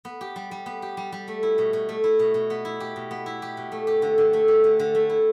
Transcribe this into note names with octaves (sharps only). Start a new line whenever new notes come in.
B3
G4
G3
G3
B3
G4
G3
G3
A3
E4
B2
B2
A3
E4
B2
B2
B3
E4
G4
B2
B3
E4
G4
B2
A3
G4
D3
D3
A3
G4
D3
D3
A3
E4